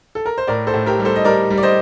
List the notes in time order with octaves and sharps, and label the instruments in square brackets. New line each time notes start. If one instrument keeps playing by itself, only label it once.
[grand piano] A4
A#4
C5
A2 A#4 D5
A4 C5
A2
G4 A#4
G3
A4 C5
D#5
G3 A#4 D5
G3
D5
C5 D#5